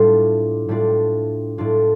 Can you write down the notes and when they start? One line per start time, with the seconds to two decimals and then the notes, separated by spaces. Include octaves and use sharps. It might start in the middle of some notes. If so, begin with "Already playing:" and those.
Already playing: A2 G3 D4 F4
0.68 A2 G3 D4 F4
1.58 A2 G3 D4 F4